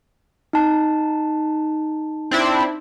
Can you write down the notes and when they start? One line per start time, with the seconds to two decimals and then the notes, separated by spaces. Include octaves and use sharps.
0.53 D#4 A5
2.31 C4 D4 E4